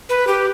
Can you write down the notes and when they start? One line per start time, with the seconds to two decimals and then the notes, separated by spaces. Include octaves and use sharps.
0.09 B4
0.27 G4